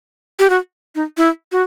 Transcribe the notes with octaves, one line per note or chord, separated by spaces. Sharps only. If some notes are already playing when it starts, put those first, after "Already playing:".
G4
F#4
D#4
E4
F#4